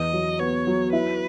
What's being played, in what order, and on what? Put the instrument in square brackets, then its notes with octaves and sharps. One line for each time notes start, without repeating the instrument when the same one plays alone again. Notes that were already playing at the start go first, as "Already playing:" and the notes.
Already playing: [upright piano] E2 [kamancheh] D#5
[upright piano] F#3
[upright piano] B3 [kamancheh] C#5
[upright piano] F#3
[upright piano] E4 [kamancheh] B4